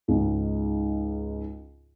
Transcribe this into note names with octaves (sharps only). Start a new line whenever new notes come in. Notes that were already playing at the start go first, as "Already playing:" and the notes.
C#2 G#2